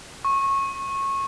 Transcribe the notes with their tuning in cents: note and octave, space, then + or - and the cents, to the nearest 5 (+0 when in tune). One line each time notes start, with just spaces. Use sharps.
C#6 -20